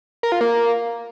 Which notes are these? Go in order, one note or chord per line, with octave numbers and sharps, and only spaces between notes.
A#4
F4
A#3